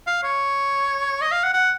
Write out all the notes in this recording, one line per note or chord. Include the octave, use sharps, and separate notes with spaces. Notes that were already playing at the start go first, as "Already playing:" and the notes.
F5
C#5
D#5
F5
F#5
F#5